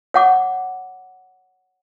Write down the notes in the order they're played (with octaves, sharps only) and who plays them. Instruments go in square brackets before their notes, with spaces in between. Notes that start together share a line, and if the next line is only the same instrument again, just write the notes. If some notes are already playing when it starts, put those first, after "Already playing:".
[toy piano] C#5 F#5 D6